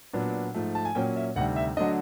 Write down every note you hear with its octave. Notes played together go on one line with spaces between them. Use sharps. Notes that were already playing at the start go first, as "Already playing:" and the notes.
A#2 F#3 B3 D4
G#2 F3 A3
A5
G#5
A#2 F#3 A#3 C#4 G5
E5
D2 C3 D#3 G3 F#5
E5
D3 F#3 A3 D4 D#5